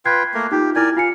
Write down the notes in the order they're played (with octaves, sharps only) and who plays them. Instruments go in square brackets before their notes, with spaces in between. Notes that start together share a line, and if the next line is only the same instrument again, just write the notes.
[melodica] F4 B4 G5 [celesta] F#6 G#6 C7
[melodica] A3 A#3 A#4
[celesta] D#4 F4 [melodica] G4
[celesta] E4 G#6 [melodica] A#4 D5 G#5
[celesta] F4 G#5 C#7 [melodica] F5